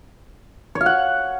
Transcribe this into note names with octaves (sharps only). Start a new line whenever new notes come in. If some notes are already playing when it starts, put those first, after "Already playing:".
C#5
F5
F#5